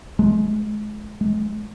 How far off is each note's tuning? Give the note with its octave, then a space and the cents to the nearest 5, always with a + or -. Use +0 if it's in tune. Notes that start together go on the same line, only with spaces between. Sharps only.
G#3 +30
G#3 +35